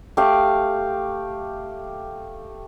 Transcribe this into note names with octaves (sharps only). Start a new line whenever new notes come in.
A3 G4 F5